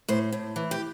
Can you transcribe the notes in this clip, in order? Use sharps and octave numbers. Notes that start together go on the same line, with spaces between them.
A2 C5
A2
E3
G4